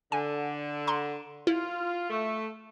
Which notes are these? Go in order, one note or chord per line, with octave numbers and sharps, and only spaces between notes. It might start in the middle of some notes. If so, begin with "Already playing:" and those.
D3 G#5
A#5 C6
E4 F4
A3